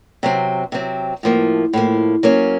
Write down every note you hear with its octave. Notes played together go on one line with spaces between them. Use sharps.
C3 F#3 C4
C3 F#3 C4
A2 F3 A#3
A2 F3 A#3
F#3 A#3 C#4